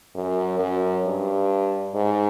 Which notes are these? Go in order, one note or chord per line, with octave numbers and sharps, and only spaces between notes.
F#2
F#2
G2
G#2